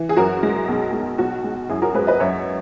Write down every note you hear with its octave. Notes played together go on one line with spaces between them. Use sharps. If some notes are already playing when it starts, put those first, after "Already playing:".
Already playing: E3
G#4
F#2 F#4 A#4
G#3
B1
G#3
B1 F#4
G#3
F#2 E4 G#4
F#4 A#4
G#3 G#4 B4
B4 D#5
F#2 C#5 E5